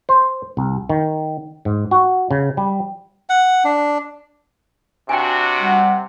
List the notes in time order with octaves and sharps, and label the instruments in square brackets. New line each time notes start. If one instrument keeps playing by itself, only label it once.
[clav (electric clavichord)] C5
C2
D#3
G#2
F#4
C#3
G3
[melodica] F#5
D4
[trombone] C3 [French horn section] D4 F#4 [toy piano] G5 G#5
[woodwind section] G3 F#5